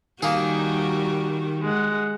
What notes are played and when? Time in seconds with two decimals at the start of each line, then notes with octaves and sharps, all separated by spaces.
0.23 D#3 G3 A#3 F#4 G#4
1.62 G#3 F#5